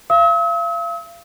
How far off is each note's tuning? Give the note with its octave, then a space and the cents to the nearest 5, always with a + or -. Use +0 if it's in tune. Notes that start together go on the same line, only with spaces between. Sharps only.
F5 -40 E6 -45